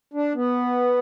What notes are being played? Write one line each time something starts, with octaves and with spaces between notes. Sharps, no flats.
D4
B3